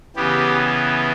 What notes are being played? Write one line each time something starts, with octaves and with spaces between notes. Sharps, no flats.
C#3 E3 B3 G4